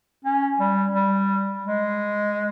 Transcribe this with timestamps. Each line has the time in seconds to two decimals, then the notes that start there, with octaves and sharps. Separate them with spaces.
0.24 C#4
0.60 G3
0.94 G3
1.66 G#3